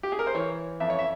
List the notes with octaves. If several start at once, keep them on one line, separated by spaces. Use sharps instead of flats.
G4
G#4
A#4
C5
E3 C#5
F2 E5
C#5
E5